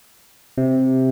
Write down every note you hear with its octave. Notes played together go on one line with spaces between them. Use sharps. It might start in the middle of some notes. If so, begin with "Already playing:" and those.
C3